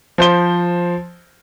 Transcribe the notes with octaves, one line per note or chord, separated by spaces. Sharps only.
F3 C5 G7